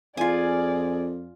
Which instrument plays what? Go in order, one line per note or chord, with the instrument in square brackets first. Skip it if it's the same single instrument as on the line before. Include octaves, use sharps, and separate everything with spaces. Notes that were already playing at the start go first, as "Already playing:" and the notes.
[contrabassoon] F2 [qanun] F4 G#5 [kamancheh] G#4 D5